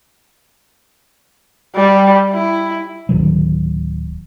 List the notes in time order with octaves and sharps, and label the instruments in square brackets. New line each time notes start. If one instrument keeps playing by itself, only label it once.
[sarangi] G3
E4
[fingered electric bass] D1 D#3 F#3